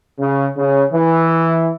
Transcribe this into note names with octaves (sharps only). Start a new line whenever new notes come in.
C#3
C#3
E3